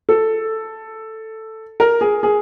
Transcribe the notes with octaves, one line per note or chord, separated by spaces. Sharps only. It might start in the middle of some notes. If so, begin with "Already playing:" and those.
A4
A#4
G#4
G#4